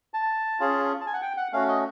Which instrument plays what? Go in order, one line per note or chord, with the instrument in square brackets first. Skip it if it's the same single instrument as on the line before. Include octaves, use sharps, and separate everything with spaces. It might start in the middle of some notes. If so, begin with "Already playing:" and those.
[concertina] A5
C#4 F4 G#4
A5
G#5
F#5
G5
F#5
A3 C#4 F#4 F5
D#5